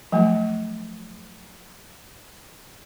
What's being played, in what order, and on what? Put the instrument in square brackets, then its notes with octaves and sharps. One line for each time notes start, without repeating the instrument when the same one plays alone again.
[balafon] F3 F#3 A3